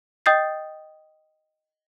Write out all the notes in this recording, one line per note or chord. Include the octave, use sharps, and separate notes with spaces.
D#5 G5 D#6 G6 A6 C7